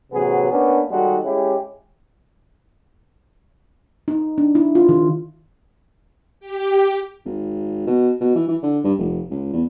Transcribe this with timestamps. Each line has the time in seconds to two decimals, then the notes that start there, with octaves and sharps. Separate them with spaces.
0.12 A1 C3 F#3 B3 F#4 G#4
0.51 A#3 B3 C#4 D4
0.91 D#2 G3 G#3 D#4 F#4 A4
1.25 G#3 C#4 E4 G4
4.08 D#4
4.38 D4
4.55 E4
4.75 F4
4.89 D#3
6.40 G4
7.26 G#1
7.87 B2
8.21 B2
8.35 E3
8.48 E3
8.63 D3
8.84 G2
8.98 F1
9.31 C#2
9.53 E2